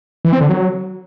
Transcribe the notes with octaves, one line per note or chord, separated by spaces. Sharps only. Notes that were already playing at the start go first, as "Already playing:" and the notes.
E3
C4
D3
F#3